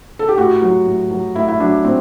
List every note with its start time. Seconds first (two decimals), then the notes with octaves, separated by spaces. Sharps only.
0.19 A4
0.28 G4
0.37 A2 F#4
0.62 F#3
0.87 A2
1.11 F#3
1.35 A2 E4
1.48 E4
1.60 F#3 D4
1.84 A2 C4